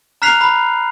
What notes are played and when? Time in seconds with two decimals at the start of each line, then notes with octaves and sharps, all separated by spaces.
0.22 A#5 F6 F#6 B6 C7 F7
0.41 B5